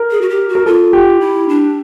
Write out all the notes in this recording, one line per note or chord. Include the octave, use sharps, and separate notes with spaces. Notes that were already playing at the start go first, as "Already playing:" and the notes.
Already playing: A#4
G#4
F#4
G4
F#4
A#4
F4 A4
G4
E4
D4